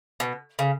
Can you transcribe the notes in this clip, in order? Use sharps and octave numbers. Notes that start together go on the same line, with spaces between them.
B2
C#3